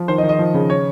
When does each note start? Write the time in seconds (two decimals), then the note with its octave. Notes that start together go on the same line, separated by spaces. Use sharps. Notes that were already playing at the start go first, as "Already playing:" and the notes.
Already playing: F3
0.08 D#3 C5
0.18 D#5
0.23 D#3
0.29 D#5
0.39 F3
0.54 C#3
0.70 C#5